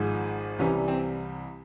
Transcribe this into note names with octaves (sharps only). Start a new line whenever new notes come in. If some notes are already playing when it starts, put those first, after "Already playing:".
Already playing: G#1 G#2 F3 G#3
C2 C3 E3 G3 C#4
C4